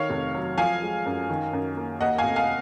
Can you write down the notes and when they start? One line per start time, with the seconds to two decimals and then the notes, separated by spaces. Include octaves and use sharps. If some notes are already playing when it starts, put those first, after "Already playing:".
Already playing: D#3 C#5 F5
0.10 F1
0.35 F#3
0.58 F3 F5 G#5
0.82 G#3
1.06 F#2
1.29 D#3
1.53 F#2
1.77 A#3
2.00 D#2 D#5 F#5
2.18 F5 G#5
2.24 F1
2.36 F5 G#5